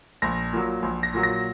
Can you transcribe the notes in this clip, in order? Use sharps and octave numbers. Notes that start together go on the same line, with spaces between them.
A#1 A#6
A#2 F#3
A#1
A#6
A#2 F#3
A#6